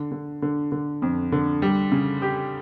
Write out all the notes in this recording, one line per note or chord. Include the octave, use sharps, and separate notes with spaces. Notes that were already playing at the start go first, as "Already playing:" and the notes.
Already playing: D3
D3
D3
D3
F2
D3
G3
C#3
G4